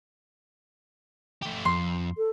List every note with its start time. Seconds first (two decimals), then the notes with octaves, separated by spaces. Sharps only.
1.42 A3 G4
1.65 F2 C6
2.17 A4